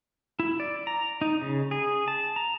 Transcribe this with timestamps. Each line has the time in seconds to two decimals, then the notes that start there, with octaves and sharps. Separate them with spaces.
0.40 E4
0.60 D5
0.87 A#5
1.22 D#4
1.42 C#3
1.71 G#4
2.08 A5
2.36 A#5